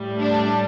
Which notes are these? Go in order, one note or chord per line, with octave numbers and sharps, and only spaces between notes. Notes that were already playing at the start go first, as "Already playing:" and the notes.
Already playing: A2 G3
D4